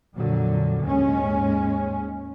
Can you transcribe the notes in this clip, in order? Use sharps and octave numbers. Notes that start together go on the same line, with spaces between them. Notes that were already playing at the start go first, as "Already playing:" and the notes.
F2 A#2 D3 F#3
D#2 G#2 G#3 C#4